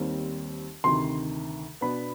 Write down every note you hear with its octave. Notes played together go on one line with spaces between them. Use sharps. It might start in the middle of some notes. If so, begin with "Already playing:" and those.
Already playing: D#2 D#3 G3 C4
D2 C3 D#3 C6
B2 B3 D4 B5